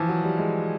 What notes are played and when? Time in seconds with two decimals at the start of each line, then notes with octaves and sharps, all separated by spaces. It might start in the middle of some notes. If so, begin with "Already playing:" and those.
Already playing: E3 F3
0.09 F#3
0.24 G3
0.38 G#3